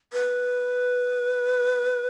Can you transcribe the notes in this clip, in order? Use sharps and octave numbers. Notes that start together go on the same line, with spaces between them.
B4